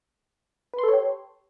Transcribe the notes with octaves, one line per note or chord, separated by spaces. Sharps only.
G4 A4 B4 C#5 C6